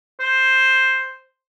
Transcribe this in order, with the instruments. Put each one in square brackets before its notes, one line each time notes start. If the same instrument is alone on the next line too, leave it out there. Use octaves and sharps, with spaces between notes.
[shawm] C5